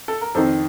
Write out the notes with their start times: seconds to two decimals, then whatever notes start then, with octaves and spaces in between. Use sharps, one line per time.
0.08 A4
0.21 A#4
0.35 F2 D#3 A4 C5